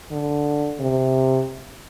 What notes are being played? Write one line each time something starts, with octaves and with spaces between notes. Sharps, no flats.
D3
C3